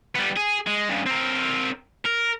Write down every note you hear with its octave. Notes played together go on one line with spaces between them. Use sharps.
G3 B3
G#4
G#3
G2 C#3
C4 A#4
A#4